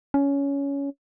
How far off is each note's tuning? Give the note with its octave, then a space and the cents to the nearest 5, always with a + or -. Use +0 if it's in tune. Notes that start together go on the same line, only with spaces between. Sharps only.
C#4 +15